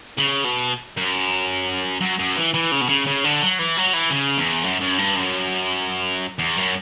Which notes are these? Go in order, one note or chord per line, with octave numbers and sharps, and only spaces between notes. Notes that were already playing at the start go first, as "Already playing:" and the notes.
C#3
B2
F#2
F#2
F#2
E3
E3
C#3
B2
C#3
C#3
D3
F#3
E3
F#3
E3
C#3
E2
F#2
F#2
G2
F#2
E2
F#2